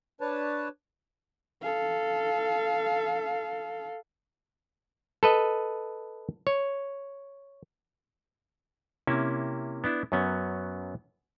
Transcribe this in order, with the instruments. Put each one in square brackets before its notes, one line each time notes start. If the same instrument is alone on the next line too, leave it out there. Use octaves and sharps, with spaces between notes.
[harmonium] D4 B4 C#5 A5
[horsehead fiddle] A4 F5
[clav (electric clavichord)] A4 B4 D#5
C#5
C3 A#3 C#4 E4
B3 D4 E4
F#2 F#3 B3 C#4